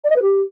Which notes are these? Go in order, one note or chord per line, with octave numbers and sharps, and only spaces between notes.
D5
D#5
B4
G4